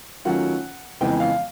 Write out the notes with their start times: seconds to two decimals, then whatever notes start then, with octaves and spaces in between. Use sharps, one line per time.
0.25 D#3 F#3 A3 C#4 F4 F#5
1.01 F2 C#3 E3 G#3 B3 G5
1.20 F5